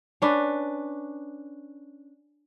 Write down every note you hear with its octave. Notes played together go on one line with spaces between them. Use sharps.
C#4 D4 B4